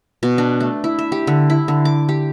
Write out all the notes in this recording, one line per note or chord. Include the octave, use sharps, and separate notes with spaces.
B2
D4
A3
E4
E5
G4
D3
E4
D3
D6
G4